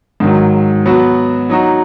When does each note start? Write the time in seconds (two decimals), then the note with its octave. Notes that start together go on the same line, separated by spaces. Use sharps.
0.20 G#2 D#3 F#3
0.86 F#3 B3 F#4
1.49 F#3 D#4 F#4